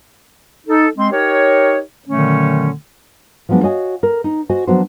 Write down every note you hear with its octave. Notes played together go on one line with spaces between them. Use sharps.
D#4 A4
G#3 C4 C6
D#4 G4 A#4 C#5
A#2 D3 D#3 F#3 A3 C#4
F3 F#3 G#3 B3 D4
F#4 C#5 D#5 F5 G#5
A#4
D#4
F#4 C5 D#5 G#5
F3 F#3 B3 D4 F#4 C5